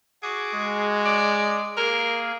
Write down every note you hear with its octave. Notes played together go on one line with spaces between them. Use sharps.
F#4 G#4 D6
G#3
D5
A#3 G#4 A#4